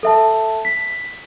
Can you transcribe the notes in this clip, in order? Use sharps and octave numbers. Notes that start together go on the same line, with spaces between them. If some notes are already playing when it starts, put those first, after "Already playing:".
A4 E5 A5
B6